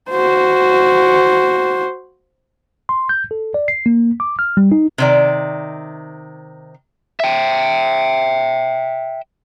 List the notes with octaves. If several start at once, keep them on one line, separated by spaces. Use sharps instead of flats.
F#4 C5
C6
G6
A4
D5
C7
A#3
D6
F6
G3
D#4
C3 D#3 D5
E5 G5